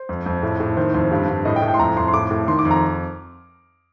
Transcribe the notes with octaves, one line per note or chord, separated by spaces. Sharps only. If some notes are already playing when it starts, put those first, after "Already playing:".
Already playing: C5
F2
F2
A2
A2
D#3 C5
F2 C5
G2
G2
A2 D#5
G5
A2
G5
C6
F2 A#5
F2 C6
C6
A2 D6
A2
D#3 C6
D6
F2
A#5